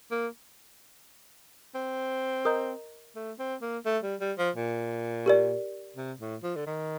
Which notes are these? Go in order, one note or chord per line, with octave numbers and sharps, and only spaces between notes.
A#3
C4
A#4 D#5 A#5 D#6 G6
A3
C4
A#3
A3
G3
G3
F3
A#2
G4 A#4 D5
C3
A2
F3
D3
D#3